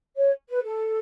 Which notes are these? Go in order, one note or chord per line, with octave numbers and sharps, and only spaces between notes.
C#5
B4
A4